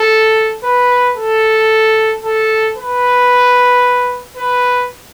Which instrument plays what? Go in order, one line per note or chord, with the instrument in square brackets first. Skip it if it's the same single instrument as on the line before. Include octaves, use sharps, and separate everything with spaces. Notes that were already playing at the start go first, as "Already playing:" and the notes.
Already playing: [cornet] A4
B4
A4
A4
B4
B4